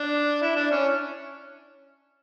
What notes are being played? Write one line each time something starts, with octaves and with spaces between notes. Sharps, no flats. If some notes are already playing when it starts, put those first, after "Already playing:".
Already playing: D4
E4
D4
C#4